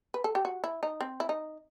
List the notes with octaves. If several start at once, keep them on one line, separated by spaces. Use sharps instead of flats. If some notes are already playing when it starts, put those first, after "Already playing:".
B4
A4
G4
F#4
E4
D#4
C4
E4
D#4